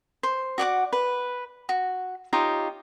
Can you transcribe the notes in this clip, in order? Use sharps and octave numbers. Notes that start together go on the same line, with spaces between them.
C5
F#4 D5 F#5 D6
B4
F#4
D#4 F4 G4 C#5